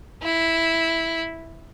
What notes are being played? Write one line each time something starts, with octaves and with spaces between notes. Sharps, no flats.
E4